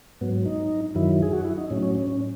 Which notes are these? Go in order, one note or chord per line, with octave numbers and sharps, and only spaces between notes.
G#2 F#3 B3
D#4
F#2 D#3 F#3 E4
G#4
F#4
E4
D#4
A2 F#3 C#4
C#4
C#4
C#4